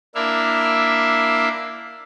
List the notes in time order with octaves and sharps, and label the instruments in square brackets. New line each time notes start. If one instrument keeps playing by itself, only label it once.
[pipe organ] A#3 D4 E4 E5 F5